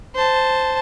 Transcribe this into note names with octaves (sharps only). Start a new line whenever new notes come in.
C5 A5